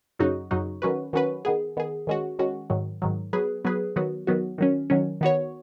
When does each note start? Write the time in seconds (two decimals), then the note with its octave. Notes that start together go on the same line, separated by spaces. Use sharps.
0.19 F#2 C#3 F#3 D#4 F#4
0.51 F#2 C#3 F#3 D#4 F#4
0.82 D#3 F#3 C#4 F#4 B4
1.13 D#3 F#3 C#4 F#4 B4
1.45 D#3 B3 G#4
1.77 D#3 B3 G#4
2.07 D#3 G#3 C#4 F#4
2.39 D#3 G#3 C#4 F#4
2.70 G#2 D#3 F#3
3.02 G#2 D#3 F#3
3.33 F#3 B3 G#4 B4
3.65 F#3 B3 G#4 B4
3.96 D#3 F#3 B3 F#4
4.27 D#3 F#3 B3 F#4
4.58 D#3 F#3 C#4
4.90 D#3 F#3 C#4
5.21 D#3 B3 F#4 C#5